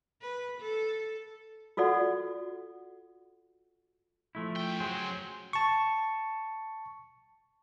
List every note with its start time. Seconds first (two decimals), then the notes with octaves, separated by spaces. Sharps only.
0.21 B4
0.61 A4
1.77 F4 F#4 A4 D5 F#5
4.35 F3 A3 E4
4.56 F#2 G5
4.80 F#3 G#4 C5
5.53 A5 C#6